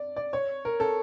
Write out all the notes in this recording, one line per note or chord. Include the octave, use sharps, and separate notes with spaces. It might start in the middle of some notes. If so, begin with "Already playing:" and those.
Already playing: D5
D5
C#5
A#4
A4